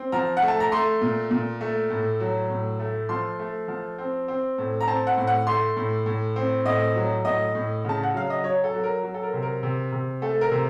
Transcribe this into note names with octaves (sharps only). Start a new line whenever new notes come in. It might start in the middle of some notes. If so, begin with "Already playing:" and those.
Already playing: C4
F3 A#5
F#5
A3
A5
A#5
A3 C6
A#2
A#2
A3
A2
F#3
A2
A3
F3 C6
A3
F3
C4
C4
A2
A#5
C4 A5
F#5
A2
F#5
A3 C6
A2
A2
C4
A2 D#5
F#3
A2 D#5
A2
C#3 A5
F#5
F#3 F5
D#5
F#3 C#5
A4
F#3
A#4
F#3
A4
A#4
C3
A#4
C3
C3
A3 A4
A#4
C3